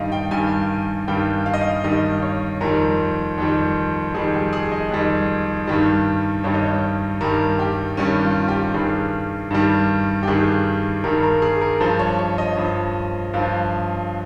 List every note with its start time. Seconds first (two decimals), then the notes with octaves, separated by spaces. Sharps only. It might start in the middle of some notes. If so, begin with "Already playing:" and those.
Already playing: G2 D#3 G3 D#5 F5
0.12 G5
0.31 G2 D#3 G3 G#5
1.08 G2 D#3 G3 G5
1.46 F5
1.54 D#5
1.61 F5
1.84 G2 D#3 G3 D#5
2.22 C#5
2.61 F2 D#3 G3 A#4
3.38 F2 D#3 G3
4.14 F2 D#3 G3 G#4
4.33 G4
4.53 G#4
4.72 D#5
4.91 F2 D#3 G3
5.67 G2 D#3 G3
6.44 G2 D#3 G3 C#5
6.54 D#5
6.63 C#5
7.21 G2 D#3 G3 A#4
7.59 G4
7.97 G2 D#3 G3 C#4
8.23 F4
8.48 G4
8.74 G2 D#3 G3 G#4
9.51 G2 D#3 G3
10.23 G4
10.27 G2 D#3 G3 G#4
11.04 G2 D#3 G3 A#4
11.23 A#4
11.42 G#4
11.62 A#4
11.80 G2 F3 C5
11.99 C#5
12.19 C#5
12.38 D#5
12.57 G2 F3
13.34 G2 F3 F5